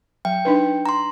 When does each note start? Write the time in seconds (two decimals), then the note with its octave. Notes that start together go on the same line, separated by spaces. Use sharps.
0.25 F#3 G5
0.45 D4 D#4 B4
0.86 A#5 C6